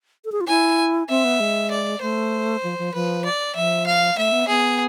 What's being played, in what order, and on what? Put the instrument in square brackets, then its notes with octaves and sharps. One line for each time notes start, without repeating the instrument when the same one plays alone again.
[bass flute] A4
G#4
F4
[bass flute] E4 [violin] G#5
[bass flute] C4 [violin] E5
[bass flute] B3
G#3
[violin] D5
[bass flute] A3 [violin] C5
[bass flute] F3
F3
[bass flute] F3 [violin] B4
[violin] D5
[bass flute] F3 [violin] E5
[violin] F5
[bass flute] A3 [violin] E5
[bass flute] B3
[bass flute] B3 [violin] G#4